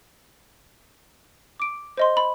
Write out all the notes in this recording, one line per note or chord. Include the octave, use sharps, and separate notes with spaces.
D6 D7
C5 D#5 C6
B5